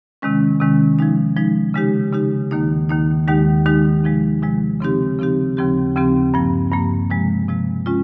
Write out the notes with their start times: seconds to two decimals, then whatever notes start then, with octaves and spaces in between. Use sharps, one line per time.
0.22 C3 D#3 G#3 C#4
0.60 C3 D#3 G#3 C#4
0.99 F3 G#3 D#4
1.37 F3 G#3 D#4
1.74 C#3 G#3 D#4 G4
2.13 C#3 G#3 D#4 G4
2.51 D#2 D#3 A#3 D#4
2.89 D#2 D#3 A#3 D#4
3.28 D#2 D#3 G#3 D#4 G4
3.66 D#2 D#3 G#3 D#4 G4
4.04 C3 F3 G#3
4.42 C3 F3 G#3
4.80 C#3 F3 C4 D#4 G4
5.19 C#3 F3 C4 D#4 G4
5.57 D#2 C#3 F3 C4 G4
5.96 D#2 C#3 F3 C4 G4
6.34 G2 F3 A#3
6.72 G2 F3 A#3
7.10 C3 F3 G#3
7.48 C3 F3 G#3
7.86 G#3 C#4 F4